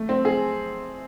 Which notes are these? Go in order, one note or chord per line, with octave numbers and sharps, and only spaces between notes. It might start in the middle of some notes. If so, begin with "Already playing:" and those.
Already playing: A3
C4
G#4